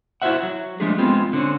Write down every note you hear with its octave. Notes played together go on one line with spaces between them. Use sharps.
E4 F#4 G4 C5 E5 F#5
F#3
F3 G#3 A3 D4 G4 G#4
G#3 B3 C4 F4
D3 C4 C#4